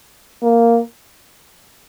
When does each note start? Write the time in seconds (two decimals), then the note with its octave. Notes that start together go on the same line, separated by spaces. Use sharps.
0.42 A#3